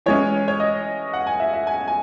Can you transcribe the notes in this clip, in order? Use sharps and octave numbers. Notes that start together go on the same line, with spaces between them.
E3 G#3 C#4 C#5
C#5
D#5
F#5
G#5
E5
E5
G#5
G#5